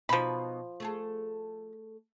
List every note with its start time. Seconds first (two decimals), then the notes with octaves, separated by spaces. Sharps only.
0.09 B2 F3 D#4 B5
0.80 A3 G#4 A4